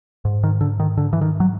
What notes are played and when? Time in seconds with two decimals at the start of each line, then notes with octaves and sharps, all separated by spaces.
0.25 G#2
0.44 D#3
0.61 D3
0.80 D#3
0.97 D3
1.13 E3
1.21 D#3
1.40 F#3